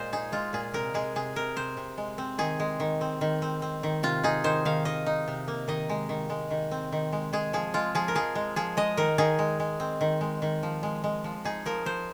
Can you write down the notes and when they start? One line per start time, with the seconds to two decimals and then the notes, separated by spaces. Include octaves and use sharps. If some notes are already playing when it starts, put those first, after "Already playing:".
Already playing: A#2 G#3 C5 D#5
0.12 D#4 G#4
0.32 G#3 F4
0.53 A#2 G#4
0.74 C3 A#4
0.94 G#3 G#4
1.16 C3 G#4
1.36 C3 A#4
1.56 C3 C5
1.77 C3
1.98 G#3
2.18 C4
2.38 D#3 G#4
2.60 G#3
2.80 D#3
3.01 C4
3.21 D#3
3.42 C4
3.62 C4
3.83 D#3
4.03 C3 F4
4.23 D#4 G#4
4.44 D#3 C5
4.65 D#3 F5
4.85 D#3 D#5
5.06 D#4
5.28 C3
5.48 A#3
5.68 D#3 D#5
5.89 G#3
6.09 D#3
6.30 G#3
6.51 D#3
6.71 C4
6.92 D#3
7.12 G#3
7.33 G#3 G#4
7.53 F3 G#4
7.74 G#3 F4
7.95 F3 G#4
8.08 A#4
8.15 F3 G#4
8.35 G#3
8.56 F3 G#4
8.77 G#3 D#5
8.97 D#3 A#4
9.18 D#3 G#4
9.39 G#3
9.60 G#3
9.80 C4
10.01 D#3
10.21 G#3
10.42 D#3
10.63 F3
10.83 G#3
11.04 G#3
11.24 F3
11.45 D#4 G#4
11.66 F3 A#4
11.86 F3 C5